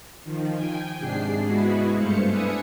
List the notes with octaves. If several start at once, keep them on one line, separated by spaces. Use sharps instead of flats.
D#3 F3
G5 G#5
G#2 C3 D4 G#4 C7
G#3 B3 E4 F#4 G#4 B4
G2 A3 C5 F5 C#7
D4 B4 E5 G#5 D#6 C#7